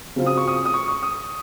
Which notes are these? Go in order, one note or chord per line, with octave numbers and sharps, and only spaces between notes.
C#3 F#3 C4 F4
D#6
C#6
D#6
D#6
C#6
C#6
D#6